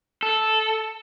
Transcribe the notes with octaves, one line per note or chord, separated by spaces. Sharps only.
A4